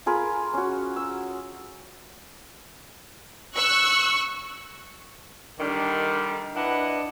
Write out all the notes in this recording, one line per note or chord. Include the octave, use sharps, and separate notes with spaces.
F4 G#4 A#4 B5
C#4 F#4
E6
C#6 E6 F#6
D3 D#3 G3
D4 E4 B4 D5 D#5 F#5